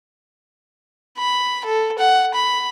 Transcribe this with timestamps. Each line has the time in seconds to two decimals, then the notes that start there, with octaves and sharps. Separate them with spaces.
1.19 B5
1.65 A4
1.99 F#5
2.34 B5